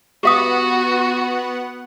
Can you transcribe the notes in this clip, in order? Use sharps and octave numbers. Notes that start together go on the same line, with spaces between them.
B3 F#4 G4 F5 F#5 D#6